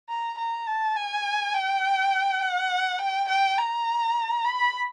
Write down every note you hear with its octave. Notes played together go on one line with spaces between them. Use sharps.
A#5
A#5
A5
G#5
G5
F#5
G5
G5
A#5
B5